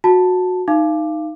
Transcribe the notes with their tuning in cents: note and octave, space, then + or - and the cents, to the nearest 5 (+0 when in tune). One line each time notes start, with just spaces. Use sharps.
F#4 -20 A5 +0
D#4 +0 F5 -25 D6 +10